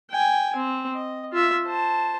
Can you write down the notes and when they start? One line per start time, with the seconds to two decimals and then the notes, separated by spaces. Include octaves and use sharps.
0.11 G5 G#5
0.56 C4
0.93 D#5
1.33 F4 E5
1.66 C5 A5